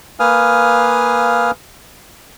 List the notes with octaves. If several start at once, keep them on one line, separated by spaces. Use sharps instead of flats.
A#3 B4 F5 G#5 D#6 F6